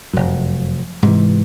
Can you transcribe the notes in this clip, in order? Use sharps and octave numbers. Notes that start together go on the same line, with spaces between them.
F1 F#2
G#2 C3 E3